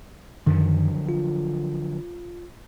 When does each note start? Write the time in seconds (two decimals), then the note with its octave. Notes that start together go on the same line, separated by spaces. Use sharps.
0.46 F#2 D3 D#3 F3 F#3
1.09 F4